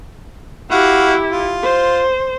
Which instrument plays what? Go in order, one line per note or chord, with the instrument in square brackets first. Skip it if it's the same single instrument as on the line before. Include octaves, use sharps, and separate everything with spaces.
[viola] E4 G4 [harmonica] F#4 F5 F#5
[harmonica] F4
[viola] C5